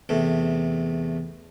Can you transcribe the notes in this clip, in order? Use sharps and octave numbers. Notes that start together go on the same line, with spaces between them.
E2 C3 A3